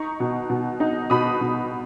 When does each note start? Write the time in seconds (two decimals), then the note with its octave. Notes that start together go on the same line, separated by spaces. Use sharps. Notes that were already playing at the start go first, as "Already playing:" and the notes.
Already playing: D#4 A#5 C#6
0.20 B2
0.50 B2
0.80 D#4
1.10 B2 B5 D#6
1.41 B2